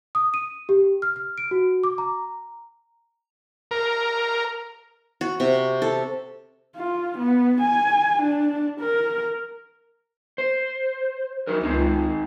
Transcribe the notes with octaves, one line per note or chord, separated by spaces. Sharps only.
D#6
D#7
G4
F6
F6
D7
F#4
D6
A#5
A#4
F#4
C3
A4
F4
B3
G#5
D4
A#4
C5
F#3 D#4 A#4
C#2 G#3 C4 D#4